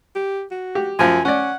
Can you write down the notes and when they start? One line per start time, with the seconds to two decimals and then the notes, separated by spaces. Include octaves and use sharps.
0.15 G4
0.51 F#4
0.75 G4
0.99 F#2 F3 G#5
1.25 C#4 D5 F#5